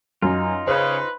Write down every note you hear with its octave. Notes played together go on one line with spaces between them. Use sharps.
F#2 D#4 F4
C#3 B4 C5